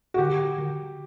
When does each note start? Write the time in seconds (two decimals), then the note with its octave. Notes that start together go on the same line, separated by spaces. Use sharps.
0.14 F#4
0.18 D3 G4
0.58 D3